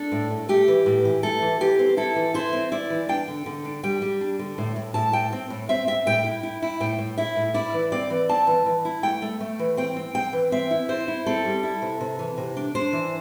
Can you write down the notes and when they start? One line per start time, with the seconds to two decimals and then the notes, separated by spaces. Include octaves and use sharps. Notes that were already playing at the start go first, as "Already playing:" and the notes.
Already playing: D4 A4
0.12 A2
0.30 A3
0.49 A3 G4
0.68 E3
0.86 A2
1.05 E3
1.23 A3 A4
1.42 E3
1.60 E3 G4
1.79 C4
1.97 E4 A4
2.16 E3
2.34 E4 C5
2.53 C4
2.72 E4 D5
2.90 E3
3.09 D4 G5
3.28 D3
3.46 D3
3.65 D4
3.83 G3 G5
4.02 G3
4.21 D4
4.39 D3
4.58 A2
4.76 A2
4.94 A2 A5
5.13 A2 G5
5.32 C4
5.50 A2
5.69 C4 E5
5.87 C4 E5
6.06 A2 G5
6.25 E4
6.43 E4
6.62 E4
6.80 A2 G5
6.99 A2
7.18 E4 E5
7.36 A2
7.54 E4 D5
7.74 E3
7.92 C4 D5
8.10 E3
8.29 C4 A5
8.47 E3
8.66 E3
8.85 E4
9.03 A3 G5
9.22 A3
9.40 A3
9.59 E3
9.77 C4 G5
9.96 C4
10.15 C4 G5
10.33 E3
10.52 C4 E5
10.71 E4
10.89 C4 C5
11.08 E4
11.26 C4 A4
11.45 G3
11.63 E4
11.82 C3
12.01 C3
12.19 E3
12.38 C3
12.57 D4
12.75 D4 C5
12.93 E3